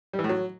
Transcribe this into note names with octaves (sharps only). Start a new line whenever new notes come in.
G3
E3
A2
F#3